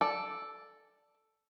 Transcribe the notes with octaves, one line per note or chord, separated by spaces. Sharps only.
A4 D5